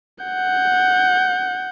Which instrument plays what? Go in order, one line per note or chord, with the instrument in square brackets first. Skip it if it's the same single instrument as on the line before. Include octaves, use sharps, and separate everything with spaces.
[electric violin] F#5 G6